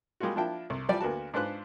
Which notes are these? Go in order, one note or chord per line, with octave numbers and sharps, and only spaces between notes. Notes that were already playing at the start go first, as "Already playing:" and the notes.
G3 G#3 A#3 F4 F#4
F3 A#3 D4 E4 G5 A5
C2
E3 F3 G3 D5
D2 A#3 B3 F#4 A5
G#2 D4 F4 B4 C5 F#6